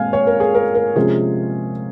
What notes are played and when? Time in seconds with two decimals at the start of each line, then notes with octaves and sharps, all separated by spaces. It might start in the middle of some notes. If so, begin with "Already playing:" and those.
Already playing: A#2 G#3 C4 F5 G#5
0.13 C#5
0.27 A#4
0.40 G#4
0.54 A#4
0.75 A#4
0.96 C3 F3 G#3 C#4 F4 G#4